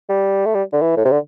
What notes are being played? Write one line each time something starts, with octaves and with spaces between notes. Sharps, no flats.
G3
A3
G3
D3
E3
A2
C3
D3